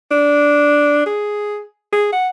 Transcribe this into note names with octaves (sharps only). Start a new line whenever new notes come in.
D4
G#4
G#4
F#5